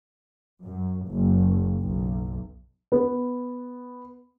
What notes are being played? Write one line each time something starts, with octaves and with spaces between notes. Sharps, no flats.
F#2
F#1
B1
B3